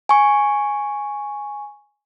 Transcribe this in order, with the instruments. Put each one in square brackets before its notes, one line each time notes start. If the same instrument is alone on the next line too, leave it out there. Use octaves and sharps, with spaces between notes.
[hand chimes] G#5 C#6